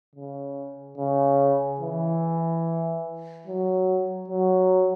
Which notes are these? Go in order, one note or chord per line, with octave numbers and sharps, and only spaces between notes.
C#3
C#3
E3
F#3
F#3